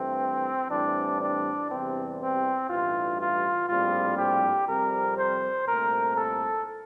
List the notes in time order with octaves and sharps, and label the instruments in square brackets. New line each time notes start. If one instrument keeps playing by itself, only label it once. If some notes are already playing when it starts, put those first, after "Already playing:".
Already playing: [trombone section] G2 E3 A3 C4
A2 E3 G3 C4 D4
D4
E2 C3 E3 G3 C4
C4
A1 G2 E3 G3 F4
F4
A#1 A2 G3 C4 F4
G4
F2 C3 G3 C4 A#4
C5
C2 A#2 A3 C4 A#4
A4